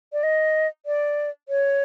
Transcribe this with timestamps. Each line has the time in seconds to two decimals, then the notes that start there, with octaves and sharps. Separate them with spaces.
0.13 D5
0.23 D#5
0.86 D5
1.49 C#5